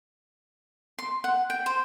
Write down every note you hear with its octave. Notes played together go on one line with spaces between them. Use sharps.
C6
F#5
G5
C5